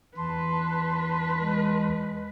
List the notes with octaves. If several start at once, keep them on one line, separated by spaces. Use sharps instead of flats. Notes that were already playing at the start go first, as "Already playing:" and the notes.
E2 B4 A5 C6
G#3